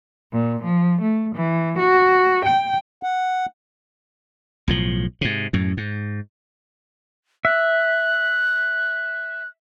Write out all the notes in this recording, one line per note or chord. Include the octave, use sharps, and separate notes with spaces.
A#2
F3
A3
E3
F#4
G5
F#5
B1 A2 F3
G#2 C3
F#2 A2
G#2
E5 F#6